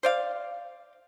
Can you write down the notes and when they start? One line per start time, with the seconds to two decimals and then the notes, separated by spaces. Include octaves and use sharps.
0.03 C5 D5 F5